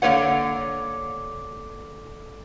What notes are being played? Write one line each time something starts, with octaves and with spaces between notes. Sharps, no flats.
D3 A#3 B4 C#5 F#5